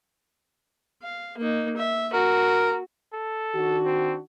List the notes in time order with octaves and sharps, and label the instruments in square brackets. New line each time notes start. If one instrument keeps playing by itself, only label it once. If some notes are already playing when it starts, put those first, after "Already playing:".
[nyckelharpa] F5
A#3 D#4
E5
[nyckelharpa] F#4 [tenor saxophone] A#4
[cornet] A4
[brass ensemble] D#3 D4 F#4
[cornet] C4